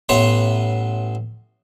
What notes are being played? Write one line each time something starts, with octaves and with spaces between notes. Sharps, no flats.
A1 B3 C#5 E5 C6